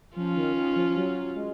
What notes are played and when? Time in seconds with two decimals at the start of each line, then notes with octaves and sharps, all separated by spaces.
0.16 F3 C#4 F4
0.36 D#3
0.56 D#3
0.76 F3
0.90 F3
0.96 F#3
1.36 G#3